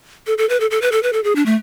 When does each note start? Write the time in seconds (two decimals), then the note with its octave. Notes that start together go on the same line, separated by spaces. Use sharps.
0.27 A4
0.38 A4
0.49 B4
0.60 A4
0.71 A4
0.82 B4
0.92 A4
1.03 B4
1.13 A4
1.24 G#4
1.36 D4
1.46 A3